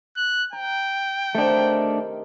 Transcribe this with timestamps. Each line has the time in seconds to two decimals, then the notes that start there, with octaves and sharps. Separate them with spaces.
0.17 F#6
0.53 G5 A#5
1.35 C3 D#3 A3 D4